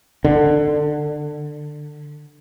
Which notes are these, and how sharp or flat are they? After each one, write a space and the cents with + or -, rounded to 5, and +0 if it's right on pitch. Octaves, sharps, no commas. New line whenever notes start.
D3 +20